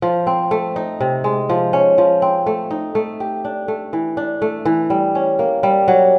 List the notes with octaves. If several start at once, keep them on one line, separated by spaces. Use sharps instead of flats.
F3
C4
A3
D#4
C3
G#3
F3
C#4
F3
C4
A3
D#4
A3
G4
D4
A3
E3
D4
A3
E3
G3
C#4
A#3
G3
F#3